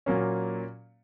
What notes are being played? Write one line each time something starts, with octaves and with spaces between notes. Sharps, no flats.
A#2 F#3 A#3 C#4